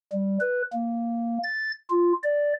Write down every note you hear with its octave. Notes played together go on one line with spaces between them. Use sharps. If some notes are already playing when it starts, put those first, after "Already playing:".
G3
B4
A#3
A6
F4
D5